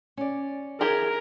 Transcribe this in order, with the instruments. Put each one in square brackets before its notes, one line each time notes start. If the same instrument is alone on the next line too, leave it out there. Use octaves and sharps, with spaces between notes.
[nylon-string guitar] C#4 D5
[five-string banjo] E4 G4 G#4 [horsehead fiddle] A#4